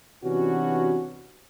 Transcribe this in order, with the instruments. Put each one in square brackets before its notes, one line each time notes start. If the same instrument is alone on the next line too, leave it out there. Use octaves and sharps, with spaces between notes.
[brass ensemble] C3 E3 B3 C#4 D4 F#4